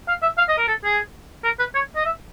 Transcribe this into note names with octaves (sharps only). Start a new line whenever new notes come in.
F5
E5
F5
D#5
A#4
A4
G#4
A#4
B4
C#5
D#5
E5